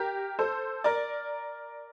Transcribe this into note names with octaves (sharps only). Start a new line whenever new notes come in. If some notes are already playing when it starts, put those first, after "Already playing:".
Already playing: G4 A#4
A4 C5
A#4 D5